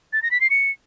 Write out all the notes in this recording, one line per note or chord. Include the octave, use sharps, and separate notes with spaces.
A6
A#6
B6
C7
C#7